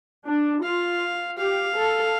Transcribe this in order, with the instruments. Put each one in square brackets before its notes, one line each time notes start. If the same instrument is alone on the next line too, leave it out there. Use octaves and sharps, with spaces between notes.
[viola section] D4
[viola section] F4 [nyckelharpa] F5
[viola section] G4 [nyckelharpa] F5
[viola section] A4